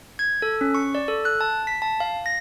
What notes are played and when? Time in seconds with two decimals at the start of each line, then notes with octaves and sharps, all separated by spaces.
0.19 G#6
0.42 A4
0.61 C#4
0.75 C#6
0.95 D5
1.08 A4
1.25 F#6
1.41 A5
1.67 B6
1.82 A5
2.00 F5
2.26 A#6